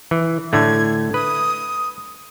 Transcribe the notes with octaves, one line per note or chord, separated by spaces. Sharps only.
E3
A2 D3 A3 G#6
B4 D#6